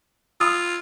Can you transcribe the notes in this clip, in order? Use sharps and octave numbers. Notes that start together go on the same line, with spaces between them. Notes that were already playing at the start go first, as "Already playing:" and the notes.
F4 B5 D#6 E6